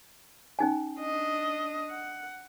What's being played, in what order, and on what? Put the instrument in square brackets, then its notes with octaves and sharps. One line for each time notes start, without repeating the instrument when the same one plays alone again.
[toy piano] C#4 D#4 G#5
[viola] D4 D#5
F#5